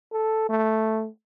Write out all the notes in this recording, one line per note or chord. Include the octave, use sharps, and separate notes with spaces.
A4
A3